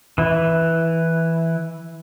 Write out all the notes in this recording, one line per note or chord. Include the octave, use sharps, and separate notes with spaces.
E3 E4